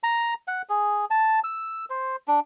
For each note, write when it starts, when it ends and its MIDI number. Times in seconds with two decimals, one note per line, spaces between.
0.04 0.34 82
0.48 0.62 78
0.69 1.05 68
1.11 1.40 81
1.44 1.85 88
1.90 2.16 72
2.28 2.40 62